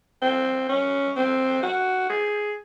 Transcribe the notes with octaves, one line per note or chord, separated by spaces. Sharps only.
C4
C#4
C4
F#4
G#4